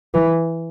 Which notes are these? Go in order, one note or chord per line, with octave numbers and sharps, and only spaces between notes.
E3